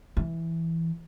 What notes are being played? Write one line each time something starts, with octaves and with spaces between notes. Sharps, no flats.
E3